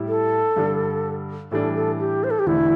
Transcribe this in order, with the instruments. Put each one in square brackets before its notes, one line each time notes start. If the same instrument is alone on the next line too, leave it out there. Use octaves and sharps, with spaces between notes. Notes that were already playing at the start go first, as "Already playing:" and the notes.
Already playing: [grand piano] A2 G3 E4
[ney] A4
[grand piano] G2 D3 G3 D4
[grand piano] A2 E3 G3 D4 [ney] A4
[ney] A4
G4
C5
A4
G4
[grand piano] E1 E2 D3 A3 [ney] E4